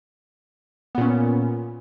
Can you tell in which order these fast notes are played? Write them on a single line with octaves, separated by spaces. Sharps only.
B3 A#2 C#4